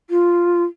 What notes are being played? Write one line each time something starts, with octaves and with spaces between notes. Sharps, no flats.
F4